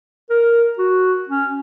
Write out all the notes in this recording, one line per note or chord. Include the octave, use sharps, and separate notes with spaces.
A#4
F#4
C#4